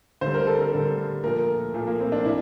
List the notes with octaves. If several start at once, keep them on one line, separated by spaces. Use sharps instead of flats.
D3 G3 C5
A#4
A4
A#4
D3 G3
A#2 F3 A3 A#4
A#2 F3 A3
A#3
C4
D4
C3 E4